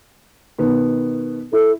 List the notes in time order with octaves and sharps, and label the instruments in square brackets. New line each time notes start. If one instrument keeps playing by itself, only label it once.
[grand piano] B2 D#3 B3
[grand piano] E4 [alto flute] A4